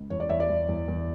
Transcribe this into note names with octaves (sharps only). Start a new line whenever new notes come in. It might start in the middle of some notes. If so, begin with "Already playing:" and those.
Already playing: C#2
E2 C#5
D5
E2 C#5 E5
D5
E2
E2
E2